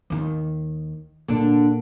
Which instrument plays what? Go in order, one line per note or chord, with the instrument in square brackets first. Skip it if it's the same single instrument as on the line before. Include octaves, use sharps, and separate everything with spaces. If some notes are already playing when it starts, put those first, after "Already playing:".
[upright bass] D#2 D#3
[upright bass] A#2 [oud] D3 D4